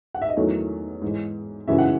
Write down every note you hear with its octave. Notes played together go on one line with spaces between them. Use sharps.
F#5
E5
D#5
E2 D#3 F#3 A3 C#5
G#2 E3 G#3
F#2 C#3 E3 G#3 C#4 E5
F#5